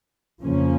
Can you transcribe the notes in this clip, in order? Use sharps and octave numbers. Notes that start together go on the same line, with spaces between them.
F2 C#3 F3 A#3 C#4